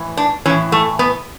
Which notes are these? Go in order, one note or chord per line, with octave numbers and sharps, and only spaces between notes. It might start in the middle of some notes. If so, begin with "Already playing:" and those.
Already playing: A2 E3
D4
A2 E3 C#4
A3
B3